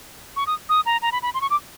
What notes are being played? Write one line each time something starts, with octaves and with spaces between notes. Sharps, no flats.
C#6
D#6
D#6
A#5
A#5
B5
B5
C6
C#6
D6